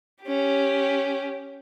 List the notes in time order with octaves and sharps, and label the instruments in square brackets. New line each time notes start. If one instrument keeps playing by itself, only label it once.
[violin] C#4 G4